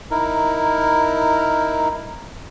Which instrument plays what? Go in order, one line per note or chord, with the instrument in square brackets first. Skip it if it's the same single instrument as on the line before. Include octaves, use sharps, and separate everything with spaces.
[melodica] D#4 E4 A#4